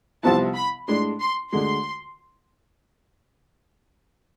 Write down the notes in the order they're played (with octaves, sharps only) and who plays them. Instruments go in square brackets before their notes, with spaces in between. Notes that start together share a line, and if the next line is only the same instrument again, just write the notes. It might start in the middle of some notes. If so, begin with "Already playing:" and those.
[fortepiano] C2 C3 F3 B3 E4 [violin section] A5
[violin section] B5
[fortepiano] A2 G#3 D4 [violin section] C6
[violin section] C6
[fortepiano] D2 D3 G#3 [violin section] C6